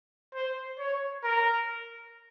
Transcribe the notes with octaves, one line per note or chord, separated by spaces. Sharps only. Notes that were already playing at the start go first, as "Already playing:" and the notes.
C5
C#5
A#4